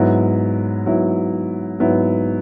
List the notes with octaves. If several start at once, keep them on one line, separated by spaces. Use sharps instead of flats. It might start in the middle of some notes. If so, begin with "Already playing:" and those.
Already playing: G#2 F#3 B3 E4
G#2 F#3 B3 E4
G#2 F#3 B3 E4